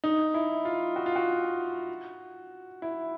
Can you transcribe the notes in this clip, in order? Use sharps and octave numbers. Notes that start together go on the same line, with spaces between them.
D#4
E4
F4
F#4
F4
F#4
E4